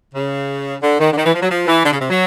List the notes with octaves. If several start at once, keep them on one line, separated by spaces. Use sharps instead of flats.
C#3
D3
D#3
D3
D#3
E3
F3
F#3
F3
E3
D3
C#3
C3
F#3